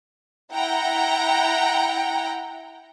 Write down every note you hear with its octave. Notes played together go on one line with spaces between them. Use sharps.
E4 F#5 G5 A#5